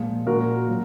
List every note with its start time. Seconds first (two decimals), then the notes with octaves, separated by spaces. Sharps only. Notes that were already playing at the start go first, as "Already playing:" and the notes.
Already playing: A#2 F3 G#3
0.26 A#2 G#3 F#4 A#4
0.68 A#2 F#3